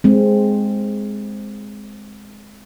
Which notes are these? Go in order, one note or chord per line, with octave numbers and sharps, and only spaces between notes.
G#3 C4